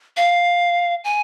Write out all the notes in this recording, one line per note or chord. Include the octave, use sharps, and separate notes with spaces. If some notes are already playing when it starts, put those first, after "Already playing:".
F5
G#5